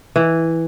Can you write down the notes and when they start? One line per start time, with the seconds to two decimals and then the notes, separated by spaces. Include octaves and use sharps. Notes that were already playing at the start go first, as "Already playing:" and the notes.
0.16 E3